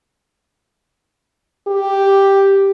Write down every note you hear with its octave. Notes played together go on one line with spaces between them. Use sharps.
G4